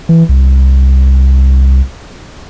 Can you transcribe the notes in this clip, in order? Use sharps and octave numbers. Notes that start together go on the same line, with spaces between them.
E3
C2